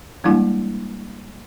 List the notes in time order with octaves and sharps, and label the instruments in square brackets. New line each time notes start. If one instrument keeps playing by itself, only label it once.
[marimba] E3 G3 G#3 A#3 D4 E4